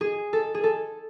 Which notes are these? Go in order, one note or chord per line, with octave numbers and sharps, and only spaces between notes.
G#4
A4
G#4
A4